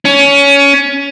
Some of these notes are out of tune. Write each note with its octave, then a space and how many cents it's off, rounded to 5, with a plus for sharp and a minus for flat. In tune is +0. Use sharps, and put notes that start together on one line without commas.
C#4 +20